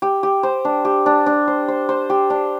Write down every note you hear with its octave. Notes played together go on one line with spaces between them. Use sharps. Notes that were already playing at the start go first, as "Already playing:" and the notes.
G4
G4
C5
D4
G4
D4
D4
C5
C5
C5
G4
D4